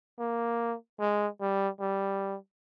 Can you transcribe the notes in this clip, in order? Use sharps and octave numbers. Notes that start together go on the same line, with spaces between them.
A#3
G#3
G3
G3